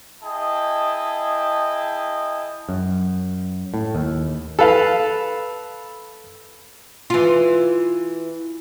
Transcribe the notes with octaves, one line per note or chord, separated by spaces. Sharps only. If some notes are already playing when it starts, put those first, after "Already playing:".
E4 G#4 D#5 G5 A5
F#2
A2
D#2
A4 B4 F5
E3 F4